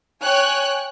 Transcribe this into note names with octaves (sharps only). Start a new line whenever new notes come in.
C#5 G5 G#5 F#6